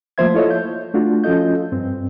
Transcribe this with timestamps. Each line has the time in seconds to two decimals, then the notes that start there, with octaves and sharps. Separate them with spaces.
0.18 F3 A3 A#3 C5 E5 G#6
0.34 E4 F4 A4 C#5 D#5 E5
0.51 G6
0.94 A3 D4 F4 F#4
1.24 F3 C#4 F4 A4 D#5 G6
1.72 G2 C4